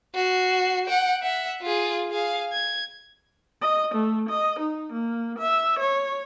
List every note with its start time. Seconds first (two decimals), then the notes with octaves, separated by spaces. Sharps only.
0.15 F#4 C7
0.86 F#5 G5
1.22 E5 F#5
1.62 F4 G#4
2.11 G#4 F5
2.52 G#6
3.62 D#5
3.95 A3
4.29 D#5
4.60 D#4
4.93 A#3
5.39 E5
5.80 C#5